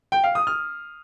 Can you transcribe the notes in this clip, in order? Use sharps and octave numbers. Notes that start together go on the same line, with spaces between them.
G5
F5
D#6
F6